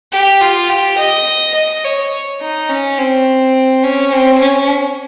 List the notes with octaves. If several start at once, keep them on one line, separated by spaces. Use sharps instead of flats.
G4
F4
G4
D#5
D#5
C#5
D#4
C#4
C4
C#4
C4
C#4